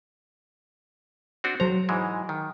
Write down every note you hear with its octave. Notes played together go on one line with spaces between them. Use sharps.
C4 D4 F#4
F#3 C5 A#5
G#2 E3 G#3
D#3